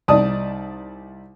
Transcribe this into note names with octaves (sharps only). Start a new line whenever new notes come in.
C2 D#4 D5 A5 D#6